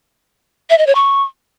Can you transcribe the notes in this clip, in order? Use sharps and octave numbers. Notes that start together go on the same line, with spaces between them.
E5
D#5
C#5
C#6